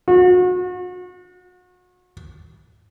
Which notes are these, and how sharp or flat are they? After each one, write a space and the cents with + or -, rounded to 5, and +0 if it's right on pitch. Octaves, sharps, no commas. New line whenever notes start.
F#4 -35